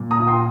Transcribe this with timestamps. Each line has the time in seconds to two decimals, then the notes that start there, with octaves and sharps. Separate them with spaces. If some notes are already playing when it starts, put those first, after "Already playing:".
Already playing: A#2
0.11 A#5 D#6
0.19 F4
0.27 G5 C6